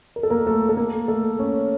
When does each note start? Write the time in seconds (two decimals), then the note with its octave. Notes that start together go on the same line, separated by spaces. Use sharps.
0.16 A#4
0.23 A4
0.30 A#3 A#4
0.47 A3 A4
0.69 A4
0.77 A#3 A#4
1.08 A3 A4
1.39 C#4 C#5